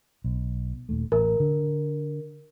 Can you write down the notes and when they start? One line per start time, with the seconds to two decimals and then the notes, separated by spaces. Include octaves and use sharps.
0.24 B1
0.89 D#1 D#2 A3
1.12 A1 A#4
1.40 D3